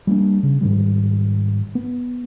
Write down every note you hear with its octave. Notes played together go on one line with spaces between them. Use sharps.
G3 A#3 B3 D4
C#3
G#2 D#3 G3
B3